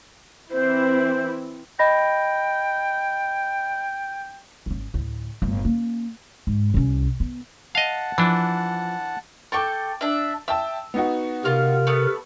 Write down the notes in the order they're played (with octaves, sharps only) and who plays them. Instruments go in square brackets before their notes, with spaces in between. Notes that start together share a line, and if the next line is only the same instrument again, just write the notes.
[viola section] E3 C4 E4 [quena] C5
[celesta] D#5 B5 A#6 [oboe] G5
[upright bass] G#1 C#4
D2 A2
G1 A2
A#3 C#4
G#2
C2 C#4
B3
[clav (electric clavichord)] D#5 F5 [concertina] F#5 A5
[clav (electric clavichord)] E3 D4 [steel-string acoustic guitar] F3
[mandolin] A4 G5 C#6 [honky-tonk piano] D6 A6
[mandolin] D4 E5
[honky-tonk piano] E5 G5 A5 [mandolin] E6
[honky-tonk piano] B3 D#4 F#4
[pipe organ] C3 A#4 [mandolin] F4
[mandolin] A3 B3 B4